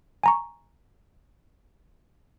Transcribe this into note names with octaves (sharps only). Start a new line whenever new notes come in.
G#5 A#5 C#6